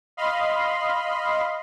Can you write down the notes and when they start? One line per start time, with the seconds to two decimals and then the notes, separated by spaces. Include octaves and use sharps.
0.17 D#5 F5 B5 C6